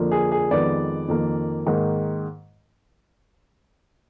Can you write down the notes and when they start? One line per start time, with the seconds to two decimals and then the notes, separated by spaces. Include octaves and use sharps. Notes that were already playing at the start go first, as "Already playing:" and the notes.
Already playing: F2 D3 F3 A#3
0.11 G#4
0.32 G#4
0.51 F2 D#3 G#3 B3 D5
1.08 F2 D#3 A#3
1.66 G#2 D#3 A#3